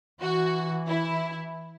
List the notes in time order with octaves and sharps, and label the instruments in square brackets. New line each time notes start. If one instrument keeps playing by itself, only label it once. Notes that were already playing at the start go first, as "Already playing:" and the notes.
[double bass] E3 [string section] F#4
[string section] E4